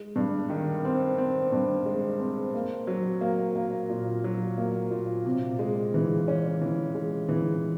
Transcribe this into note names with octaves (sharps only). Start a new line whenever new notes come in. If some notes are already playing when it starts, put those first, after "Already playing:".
Already playing: G#3
G2
D#3
C4
C4
G2
G#3
C4
A#3
F#3
A#3
A#3
A#2
F#3
A#3
A#2
C3
G#3
E3
C#4
E3
G#3
E3